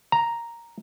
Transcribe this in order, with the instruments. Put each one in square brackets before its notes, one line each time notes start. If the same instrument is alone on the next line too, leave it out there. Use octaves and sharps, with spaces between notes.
[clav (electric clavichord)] A#5